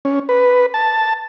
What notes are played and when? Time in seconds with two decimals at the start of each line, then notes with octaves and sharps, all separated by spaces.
0.05 C#4
0.29 B4
0.74 A5